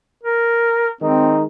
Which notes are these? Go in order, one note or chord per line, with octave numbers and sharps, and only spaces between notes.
A#4
D#3 G#3 C4 D#4